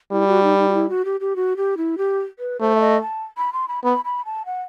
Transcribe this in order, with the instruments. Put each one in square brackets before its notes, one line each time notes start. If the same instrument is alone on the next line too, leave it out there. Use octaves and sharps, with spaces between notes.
[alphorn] G3 [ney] E4
[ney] F#4
D#4
D#4
F#4
E4
F#4
G4
G4
F#4
G4
E4
G4
B4
[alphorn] A3 [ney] C5
[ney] E5
D#5
A5
B5
C6
B5
[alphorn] B3 [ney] B5
[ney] B5
A5
F#5